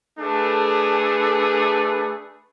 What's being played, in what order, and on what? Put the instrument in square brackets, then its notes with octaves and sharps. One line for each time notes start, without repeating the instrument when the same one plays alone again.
[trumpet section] A3 D4 G#4 A4 B4